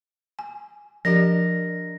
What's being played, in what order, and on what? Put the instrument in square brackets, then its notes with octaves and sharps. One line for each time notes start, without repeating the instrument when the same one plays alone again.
[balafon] G#5
[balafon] F3 G4 [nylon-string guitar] D4 A#4 D#5 [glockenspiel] A#6